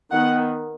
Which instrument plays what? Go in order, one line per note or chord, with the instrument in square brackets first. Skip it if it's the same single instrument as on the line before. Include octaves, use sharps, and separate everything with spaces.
[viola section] D#3 B3 F#5